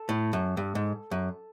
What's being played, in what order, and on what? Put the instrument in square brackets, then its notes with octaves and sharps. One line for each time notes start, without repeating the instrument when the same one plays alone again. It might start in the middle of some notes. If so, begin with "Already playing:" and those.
Already playing: [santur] A4
[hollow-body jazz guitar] A2
F#2
G2
G#2
F#2